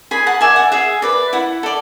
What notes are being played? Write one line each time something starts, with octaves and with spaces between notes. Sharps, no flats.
G#4 G#5 B5
F#5 A5
D5 E5 G#5
F#5
G#4 E5
B4 D5
E4 F#5
A4 D5